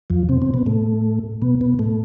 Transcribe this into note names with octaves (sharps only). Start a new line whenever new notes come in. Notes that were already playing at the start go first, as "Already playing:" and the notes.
F2 F3
C3 C4
C3 C4
B2 B3
A2 A3
B2 B3
B2 B3
A2 A3